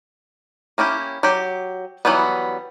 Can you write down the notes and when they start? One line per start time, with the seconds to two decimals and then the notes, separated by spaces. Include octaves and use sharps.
0.78 A#3 C#4 E4 G4
1.23 F#3 G4
2.05 E3 F#3 G3 B3